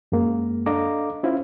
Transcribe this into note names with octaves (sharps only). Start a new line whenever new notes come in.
F#2 G#3 A#3
D4 A4 D#5 F5 A#5 D6
C#4 E4 F4 C5 F5